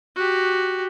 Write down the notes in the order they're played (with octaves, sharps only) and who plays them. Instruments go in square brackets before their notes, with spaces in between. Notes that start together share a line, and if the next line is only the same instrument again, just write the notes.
[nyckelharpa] F#4 G4